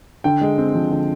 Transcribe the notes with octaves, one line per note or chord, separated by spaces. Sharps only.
D3 G5
G#3
C4
F3
D3